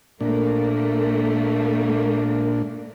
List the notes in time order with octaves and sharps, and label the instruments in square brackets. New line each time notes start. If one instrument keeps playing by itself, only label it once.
[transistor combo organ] A#2 D4 [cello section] A3 A#3